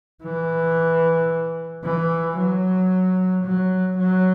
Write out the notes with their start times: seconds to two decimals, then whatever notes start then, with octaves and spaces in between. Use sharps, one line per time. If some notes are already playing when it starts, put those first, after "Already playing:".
0.23 E3
1.84 E3
2.37 F#3
3.44 F#3
3.98 F#3